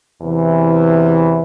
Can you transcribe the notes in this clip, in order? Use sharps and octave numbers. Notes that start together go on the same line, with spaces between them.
E2 C3 E3